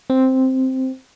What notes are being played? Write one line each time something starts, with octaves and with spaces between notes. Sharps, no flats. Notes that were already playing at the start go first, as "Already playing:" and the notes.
C4